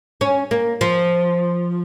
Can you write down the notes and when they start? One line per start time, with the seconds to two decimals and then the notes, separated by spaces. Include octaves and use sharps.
0.21 C#4
0.51 A#3
0.81 F3